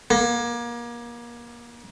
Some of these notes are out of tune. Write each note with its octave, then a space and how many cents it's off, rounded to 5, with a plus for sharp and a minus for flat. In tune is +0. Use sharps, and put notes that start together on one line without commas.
A#3 +30